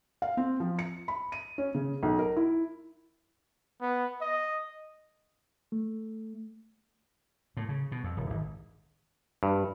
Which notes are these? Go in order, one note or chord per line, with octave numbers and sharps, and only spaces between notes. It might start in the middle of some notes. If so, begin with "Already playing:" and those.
F5
C4
F3
C#7
B5
D#7
C#4
C#3
B1
A#4
E4
B3
D#5
A3
A2
C#3
B2
F2
D#1
G#1
G2